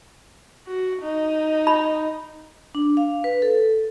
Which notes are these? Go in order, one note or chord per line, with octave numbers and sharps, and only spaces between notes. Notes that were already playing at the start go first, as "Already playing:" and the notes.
F#4
D#4
B5
D4
F5
B4
A4